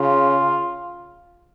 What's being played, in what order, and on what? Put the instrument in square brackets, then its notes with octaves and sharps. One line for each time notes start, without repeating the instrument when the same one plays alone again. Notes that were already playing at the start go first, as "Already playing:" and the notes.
Already playing: [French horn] C#3 [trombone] F4